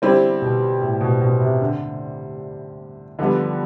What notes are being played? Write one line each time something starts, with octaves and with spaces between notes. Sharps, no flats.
D3 G3 C4 E4 G4
B2
A2
B2
B2
C3
D3
D3 F3 G3 B3